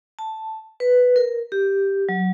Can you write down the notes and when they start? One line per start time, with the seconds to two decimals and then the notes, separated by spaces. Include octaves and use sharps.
0.19 A5
0.80 B4
1.16 A#4
1.52 G4
2.09 F#3